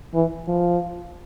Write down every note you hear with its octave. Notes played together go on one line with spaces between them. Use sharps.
E3
F3